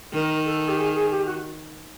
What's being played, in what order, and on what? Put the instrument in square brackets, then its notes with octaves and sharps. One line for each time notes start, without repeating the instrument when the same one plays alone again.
[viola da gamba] D#3 [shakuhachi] A#4
[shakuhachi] A4
G4
G#4
G#4
G4
F#4